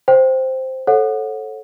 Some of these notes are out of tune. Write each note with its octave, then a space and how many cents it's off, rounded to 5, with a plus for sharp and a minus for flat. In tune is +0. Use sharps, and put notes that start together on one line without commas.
C5 +0 G5 +0
A4 -5 C#5 -30 F#5 -20